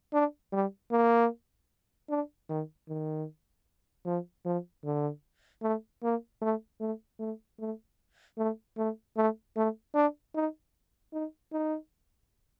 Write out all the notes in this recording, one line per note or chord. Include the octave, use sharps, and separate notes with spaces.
D4
G3
A#3
D4
D#3
D#3
F3
F3
D3
A3
A#3
A3
A3
A3
A3
A3
A3
A3
A3
D4
D#4
D#4
D#4